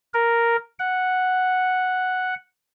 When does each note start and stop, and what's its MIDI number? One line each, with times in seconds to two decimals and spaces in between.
0.14 0.56 70
0.79 2.34 78